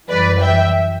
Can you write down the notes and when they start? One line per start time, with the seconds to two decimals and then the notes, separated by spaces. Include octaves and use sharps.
0.09 F#2 E3 G3 B4 D5
0.40 E5 G5